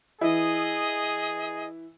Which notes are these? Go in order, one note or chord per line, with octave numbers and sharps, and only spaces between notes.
E3 E4 G#4 D#5